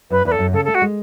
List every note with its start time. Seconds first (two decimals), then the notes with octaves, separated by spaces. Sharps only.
0.10 F#2 B4
0.25 E2 B4
0.32 A4
0.39 F#2
0.53 C#3 A4
0.65 A4
0.68 A3
0.75 F#4
0.82 G#3